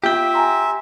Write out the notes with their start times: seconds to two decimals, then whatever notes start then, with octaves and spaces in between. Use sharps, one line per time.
0.04 B3 F4 G4 E5 G5
0.34 G#5 A#5 C6